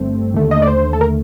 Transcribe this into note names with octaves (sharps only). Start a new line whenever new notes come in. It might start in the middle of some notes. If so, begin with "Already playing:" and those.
Already playing: G1 G2 A3 C4
D#2 D3 A3
D#5
D5
C5
A4
A#4